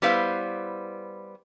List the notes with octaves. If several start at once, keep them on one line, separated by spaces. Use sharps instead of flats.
G3 B3 E4 B4 C5 F5